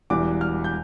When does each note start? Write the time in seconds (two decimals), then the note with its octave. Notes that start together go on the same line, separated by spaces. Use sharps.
0.10 E1 E2 E3 G3 D6
0.41 F6
0.64 G6